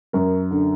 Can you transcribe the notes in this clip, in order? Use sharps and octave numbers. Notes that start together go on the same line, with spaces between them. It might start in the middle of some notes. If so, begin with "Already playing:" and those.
F#2 A#4
D3